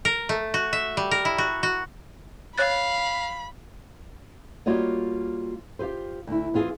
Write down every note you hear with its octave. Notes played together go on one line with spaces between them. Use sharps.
A#4
A3
F#4
E5
G3
A#4
E4
F#4
F#4
C#5 F5 B5 F#6 A6
G3 A#3 F4 F#4 C#5 D#5
F4 G4 B4 C5
D2 E4
E2 C4 F4 G#4